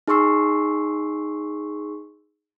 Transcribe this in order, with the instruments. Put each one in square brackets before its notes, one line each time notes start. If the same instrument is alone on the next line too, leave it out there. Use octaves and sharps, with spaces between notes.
[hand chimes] D#4 G#4 C6 C#6 E6 C7